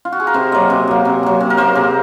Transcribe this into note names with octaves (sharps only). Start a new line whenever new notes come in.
F4
F#4
G#4
A#4
C3 C5
F#3 A#3 D#5
C3
F#3 A#3
C3
F#3 A#3
C3
A#4
F#3 A#3 C5
C3 G#4